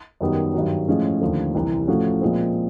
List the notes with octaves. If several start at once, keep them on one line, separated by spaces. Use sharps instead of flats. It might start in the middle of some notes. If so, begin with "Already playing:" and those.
F#2 D#3 G3 B3
G2 D#3 F#3
A2 F3 G#3 C#4
D#2 D3 F3 A3
C2 C3 E3
A2 F3 A3 C#4 F#4
A#2 F3 G#3 C4